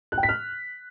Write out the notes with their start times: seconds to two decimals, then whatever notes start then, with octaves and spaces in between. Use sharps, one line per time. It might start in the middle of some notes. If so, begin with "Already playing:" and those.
0.12 F#6
0.18 G5
0.23 B6
0.29 F6